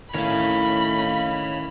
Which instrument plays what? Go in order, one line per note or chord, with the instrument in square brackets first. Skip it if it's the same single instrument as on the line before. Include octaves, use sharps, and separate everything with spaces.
[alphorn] A2 [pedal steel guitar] D#3 C#4 E4 [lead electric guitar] C#5 F5 [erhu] B5